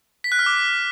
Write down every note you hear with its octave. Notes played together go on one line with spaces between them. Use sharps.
B6
F#6
F6
D6